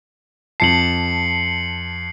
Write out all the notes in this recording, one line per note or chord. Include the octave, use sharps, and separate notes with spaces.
F2 A5 C7 C#7 F#7